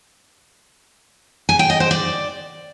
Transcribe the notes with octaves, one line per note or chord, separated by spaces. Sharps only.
G#5
G5
D#5
C5
D5